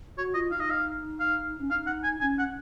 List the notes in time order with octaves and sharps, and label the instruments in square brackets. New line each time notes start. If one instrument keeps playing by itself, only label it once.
[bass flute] F#4 [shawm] C#5
[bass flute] F4 [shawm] D#5
[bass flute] D#4 [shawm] F5
[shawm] D#5
F5
F5
[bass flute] C#4
[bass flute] D#4 [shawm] F5
[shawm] F#5
G#5
[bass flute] C#4 [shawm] G#5
[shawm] F#5